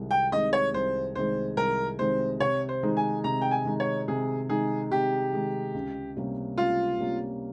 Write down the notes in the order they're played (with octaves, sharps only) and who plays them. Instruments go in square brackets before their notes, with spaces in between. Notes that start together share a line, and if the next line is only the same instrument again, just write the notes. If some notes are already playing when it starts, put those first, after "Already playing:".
Already playing: [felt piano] C2 C3 D#3 G#3
[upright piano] G5
[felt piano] C3 D#3 G#3 [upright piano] D#5
[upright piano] C#5
[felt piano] C2 [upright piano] C5
[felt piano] C3 D#3 G#3 [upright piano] C5
[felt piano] C2 [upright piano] A#4
[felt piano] C3 D#3 G#3 [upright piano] C5
[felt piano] C3 [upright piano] C#5
[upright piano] C5
[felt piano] D#3 G#3 D#4
[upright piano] G#5
[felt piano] C3 [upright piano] A#5
[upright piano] G5
G#5
[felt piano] D#3 G#3 D#4
[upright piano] C#5
[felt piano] C3 [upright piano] G#4
[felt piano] D#3 G#3 D#4 [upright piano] G#4
[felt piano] C3 [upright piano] G4
[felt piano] D#3 G#3 D#4
C#2
C3 G3 A#3 C#4
[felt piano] C#2 [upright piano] F4
[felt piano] C3 G3 A#3 C#4